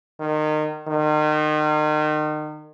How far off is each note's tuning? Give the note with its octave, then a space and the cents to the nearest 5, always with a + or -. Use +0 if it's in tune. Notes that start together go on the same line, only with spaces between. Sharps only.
D#3 -30
D#3 -35